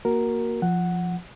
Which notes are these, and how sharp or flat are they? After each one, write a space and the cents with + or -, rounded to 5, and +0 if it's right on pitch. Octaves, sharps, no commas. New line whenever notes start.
A#3 +0 F#4 +0 A#4 +0
F3 +0 F#5 +0